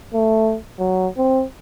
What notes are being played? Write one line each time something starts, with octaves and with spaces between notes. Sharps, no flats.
A3
F#3
C4